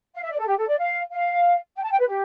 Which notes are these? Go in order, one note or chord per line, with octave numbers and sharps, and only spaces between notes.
F5
E5
D5
A4
G4
A4
D5
F5
F5
G5
A5
G5
B4
G4